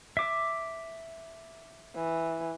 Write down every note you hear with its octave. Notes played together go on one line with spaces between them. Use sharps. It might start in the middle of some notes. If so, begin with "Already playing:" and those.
E5 D6
E3